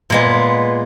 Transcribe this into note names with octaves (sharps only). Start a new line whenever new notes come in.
A#2 G#3 B3